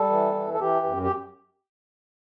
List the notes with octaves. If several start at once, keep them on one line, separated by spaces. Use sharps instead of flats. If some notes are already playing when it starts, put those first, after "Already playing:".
Already playing: G3 A4
E3
E3
A4
E3 G4
F#2
G4